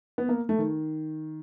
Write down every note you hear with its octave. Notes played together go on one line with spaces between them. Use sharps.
B3
A#3
A3
D#3